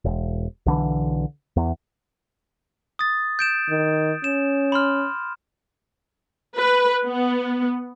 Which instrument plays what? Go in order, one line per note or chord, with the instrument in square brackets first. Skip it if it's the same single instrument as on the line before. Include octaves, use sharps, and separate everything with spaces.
[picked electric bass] E1
B1 D3 E3
E2
[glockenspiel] D#6 A6
G6 D7 E7
[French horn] D#3
[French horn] C#4 [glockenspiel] E7
[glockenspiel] B5 C6 F6
[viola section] B4
B3